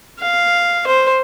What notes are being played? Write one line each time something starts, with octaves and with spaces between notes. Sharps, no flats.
F5
C5